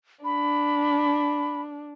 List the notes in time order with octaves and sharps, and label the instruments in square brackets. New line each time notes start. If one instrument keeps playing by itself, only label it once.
[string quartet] D4 [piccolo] B5